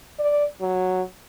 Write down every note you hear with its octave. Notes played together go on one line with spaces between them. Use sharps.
D5
F#3